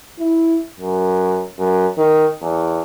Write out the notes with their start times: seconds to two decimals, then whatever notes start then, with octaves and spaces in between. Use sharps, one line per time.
0.19 E4
0.79 F#2
1.59 F#2
1.97 D#3
2.42 E2